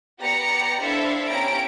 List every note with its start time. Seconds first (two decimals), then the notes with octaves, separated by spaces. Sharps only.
0.20 B3 G4 D5 A#5 C#7
0.81 D4 E4 A4 C5 E5 F5
1.29 B3 C#4 E4 G4 A#5 D7